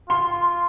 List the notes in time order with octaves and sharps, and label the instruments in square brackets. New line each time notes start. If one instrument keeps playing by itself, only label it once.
[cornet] F4 [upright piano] C6